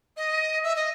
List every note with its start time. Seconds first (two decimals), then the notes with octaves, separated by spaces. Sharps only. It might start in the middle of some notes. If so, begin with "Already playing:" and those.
0.16 D#5
0.63 E5
0.76 D#5